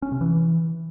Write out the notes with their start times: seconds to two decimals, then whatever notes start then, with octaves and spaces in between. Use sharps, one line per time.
0.02 C#4
0.12 C3
0.21 E3